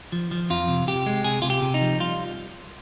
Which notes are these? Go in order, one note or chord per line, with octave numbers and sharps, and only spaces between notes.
F3
F3
F2 F4
C3
C3 G4
G#3
C3 G#4
C3 F4
G4
C3
D#4
F3
G3 F4